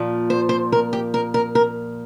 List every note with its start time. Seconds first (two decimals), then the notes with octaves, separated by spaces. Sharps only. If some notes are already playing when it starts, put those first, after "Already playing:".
Already playing: A#2 F3
0.30 C5
0.49 C5
0.72 A#4
0.93 G4
1.14 A#4
1.34 A#4
1.55 A#4